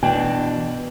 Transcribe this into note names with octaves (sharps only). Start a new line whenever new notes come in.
B2 E3 D4 G5